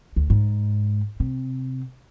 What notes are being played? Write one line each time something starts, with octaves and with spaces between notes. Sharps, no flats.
D2
G#2
C3